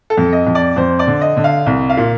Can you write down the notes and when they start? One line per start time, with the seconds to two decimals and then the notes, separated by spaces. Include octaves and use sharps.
0.10 A4
0.17 F2
0.33 D#5
0.47 F2
0.55 D5
0.76 F2 C5
0.99 D5
1.07 D3
1.21 D#5
1.37 D3
1.44 F5
1.66 C2
1.89 F5
1.97 A#2